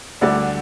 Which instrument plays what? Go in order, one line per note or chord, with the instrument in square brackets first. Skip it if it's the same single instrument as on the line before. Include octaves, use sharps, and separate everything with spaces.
[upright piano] D2 D3 G3 D5